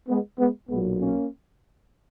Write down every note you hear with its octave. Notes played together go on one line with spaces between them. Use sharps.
G#3 B3
G#3 B3
B1 A#2 F#3 G#3 B3
A#3 C#4